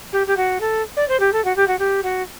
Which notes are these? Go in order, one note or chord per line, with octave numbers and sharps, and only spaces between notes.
G4
G4
F#4
A4
D5
C5
G4
A4
F#4
G4
F#4
G4
F#4